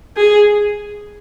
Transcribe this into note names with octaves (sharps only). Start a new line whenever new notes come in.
G#4